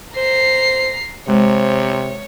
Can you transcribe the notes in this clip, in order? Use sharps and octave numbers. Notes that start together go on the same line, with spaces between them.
C5 A#5 C7
C3 G#3 C5 C#5